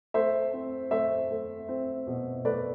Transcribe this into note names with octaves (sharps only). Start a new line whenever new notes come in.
A3 C5 E5
C4
A3 C5 E5
A3
C4
B2
A3 B4 D5